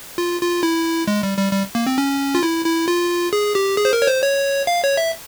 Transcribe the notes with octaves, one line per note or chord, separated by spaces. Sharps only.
F4
F4
E4
G#3
G3
G3
G3
A#3
C4
C#4
F4
E4
E4
F4
G#4
G4
G#4
C5
A#4
C#5
C5
C#5
F5
C#5
E5